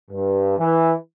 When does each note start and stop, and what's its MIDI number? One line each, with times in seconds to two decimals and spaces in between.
0.11 0.56 43
0.58 0.92 52